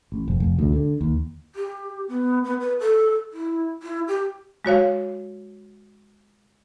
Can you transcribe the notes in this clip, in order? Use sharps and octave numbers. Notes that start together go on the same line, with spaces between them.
A1
F1
F1
D2
D3
D#2
G4
B3
B3
B4
A4
E4
E4
G4
G#3 F#4 C#5 F5